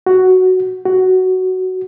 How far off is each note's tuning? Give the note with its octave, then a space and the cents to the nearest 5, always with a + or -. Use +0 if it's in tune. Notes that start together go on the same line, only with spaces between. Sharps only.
F#4 +5
F#4 +10